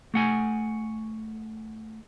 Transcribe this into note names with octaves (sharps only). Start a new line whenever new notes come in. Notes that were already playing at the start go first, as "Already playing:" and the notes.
A3 F#5 G#5